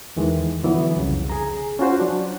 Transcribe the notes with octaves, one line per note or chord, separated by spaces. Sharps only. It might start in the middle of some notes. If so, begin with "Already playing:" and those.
E2 D#3 E3 G#3
D3 E3 F#3 B3
C2 F2 C#3
G#4 A#5
C#4 F4 F#4 C5
F#3 D4